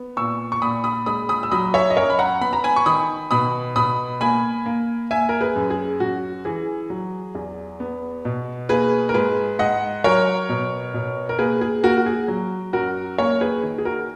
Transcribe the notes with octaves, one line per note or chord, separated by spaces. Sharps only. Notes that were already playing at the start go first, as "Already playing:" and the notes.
Already playing: B3
A#2 C#6 E6
C#6
A#2 B5 D#6
B5 D#6
G#3 B5 D#6
B5 D#6
E6
F#3 B5 D#6
C#5 E5
D#5
F#2 A#4 C#5
B5
F#5 A#5
B3 B5
A#5
G#5 B5
C#6
D#3 B5 D#6
B2 B5 D#6
B2 B5 D#6
A#3 G#5 B5
A#3
A#3 E5 G#5
A#4
G#4 B4
F#2
G#4
F#2 F#4
E3 G#4
F#3
E2
B3
B2
A#3 G#4 B4
A#4
G#2 G#4 B4
G#2 D#5 F#5
F#3 A#4 C#5
B2
B2
A#4
A#3 G#4 B4
G#4
A#3 F#4 A#4
F#4
G#4
F#3
F#2 F#4 A#4
A#3 A#4 C#5
G#4 B4
D#3
G#4
F#4 A#4